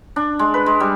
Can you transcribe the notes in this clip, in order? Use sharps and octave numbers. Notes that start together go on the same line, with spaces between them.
D4
G#3
B4
G#3
G3